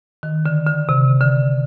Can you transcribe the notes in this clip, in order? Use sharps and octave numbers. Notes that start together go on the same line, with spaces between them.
D#3
D3
D3
C3
D3